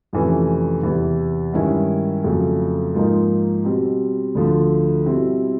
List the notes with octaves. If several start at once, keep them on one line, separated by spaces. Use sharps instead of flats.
F2 C3 E3 A3 C#4
E2 C3 E3
G2 D#3 G#3 C#4 E4
F2 C#3 F#3 A3
G#2 F3 A#3 D#4
B2 G3 C4
D2 D3 F3 A3
B2 G3 C4 E4